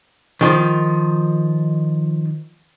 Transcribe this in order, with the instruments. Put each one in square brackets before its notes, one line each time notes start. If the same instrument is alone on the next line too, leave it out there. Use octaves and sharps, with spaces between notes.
[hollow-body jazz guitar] D#3 F3